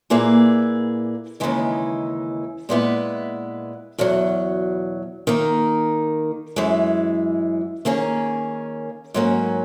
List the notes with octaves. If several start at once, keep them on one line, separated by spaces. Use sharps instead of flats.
A#2 A#3 E4 G#4 B4
D#2 C#3 E3 G#3 D#4
A#2 G#3 B3 E4 B4
E2 B2 F#3
D#3 A#3 D#4
F#2 E3 G#3
D#3 A#3 C#4 G#4
G#2 F#3 A#3 C#4